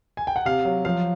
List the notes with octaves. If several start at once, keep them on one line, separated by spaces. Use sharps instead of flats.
G#5
G5
F#5
C3 F5
F#3
F3 F5